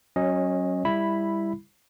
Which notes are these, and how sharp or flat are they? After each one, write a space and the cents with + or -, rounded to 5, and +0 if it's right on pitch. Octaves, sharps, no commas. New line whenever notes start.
F#3 +0 C#4 -20 D#5 +10
G3 +25 E4 +5 B5 +0